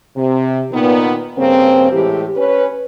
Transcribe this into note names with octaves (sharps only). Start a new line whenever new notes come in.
C3
A#2 D#3 B3
G2 C#3 A#3 C4
A2 E3 G#3 G4
C#4 B4